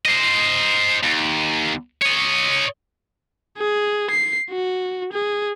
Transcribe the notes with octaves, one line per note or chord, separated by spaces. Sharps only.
C5 D#5
D#2
C#5 D#5
G#4
C7
F#4
G#4